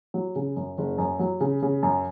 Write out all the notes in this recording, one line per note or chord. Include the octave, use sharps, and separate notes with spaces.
F#3
C#3
F#2
F#1
F#2
F#3
C#3
C#3
F#2